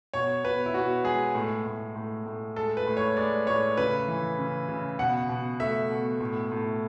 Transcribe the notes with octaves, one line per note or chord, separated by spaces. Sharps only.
B2 C#5
B2 B4
E4
B2 F#4
G#3 G#4
A2
A2
A2
A2
G#3 A4
B4
A2
C#5
G#3 D5
A2 C#5
C#3 B4
E3
C#3
C#3
B2 F#5
B2
A3 E5
B2
A2
A2